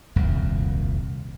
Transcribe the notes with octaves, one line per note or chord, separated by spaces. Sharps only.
D#1 C2 F2